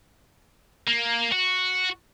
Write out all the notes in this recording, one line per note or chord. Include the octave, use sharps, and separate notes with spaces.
A#3
F#4